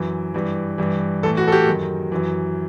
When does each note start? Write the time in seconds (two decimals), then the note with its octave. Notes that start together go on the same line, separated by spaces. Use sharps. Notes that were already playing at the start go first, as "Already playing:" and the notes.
Already playing: F#2 E3
0.34 G2 E3
0.78 G2 E3
1.23 E3 A4
1.26 A2
1.37 F#4
1.48 A4
1.52 G4
1.67 F#2 D#3
2.12 F#2 E3